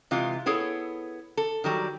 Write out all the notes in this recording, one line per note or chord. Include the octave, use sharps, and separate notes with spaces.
C3 E3 G#3 F4
B3 E4 G#4 A4 C#5
A4
D#3 F#3 G3